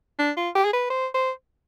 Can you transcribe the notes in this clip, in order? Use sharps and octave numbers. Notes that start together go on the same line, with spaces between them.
D4
F4
G4
G#4
B4
C5
C5